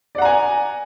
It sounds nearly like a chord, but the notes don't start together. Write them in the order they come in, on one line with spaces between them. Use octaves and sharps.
D5 F#5 A#5 G#5